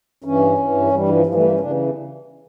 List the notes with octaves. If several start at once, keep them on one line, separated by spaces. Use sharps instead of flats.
G2 E3 C#4
G2 E3
G2 E3 G3
F3
G2 E3 F3
A3
A#3
C#4
C#3 E3 D4